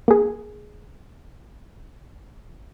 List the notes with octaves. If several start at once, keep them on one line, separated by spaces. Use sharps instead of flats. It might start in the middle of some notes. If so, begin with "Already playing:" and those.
A#3 G#4